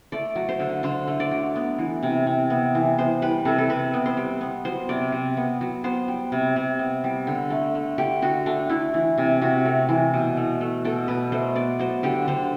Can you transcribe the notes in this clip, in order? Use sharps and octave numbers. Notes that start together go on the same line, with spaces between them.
A3 D5
F#3
C5
D3
D3 C5
A3
D5
F#3
B3
E3
C3
C3
B3
E3
B3 C5
G3 B4
C3 A4
A4
C3 B4
B3
C5
G3
B3
F#3 C5
C3 D5
C3
B3
F#3
B3 C5
G3
C3
C3
B3
G3
D3
A3
A3
D3 G4
D3 F#4
A3 D4
A3 E4
E3
C3
C3 F#4
A3
E3
B2
A3
A3
B2 A4
B2 B4
A3 C5
B3 D5
F#3 C5
D3 G4
D3 C5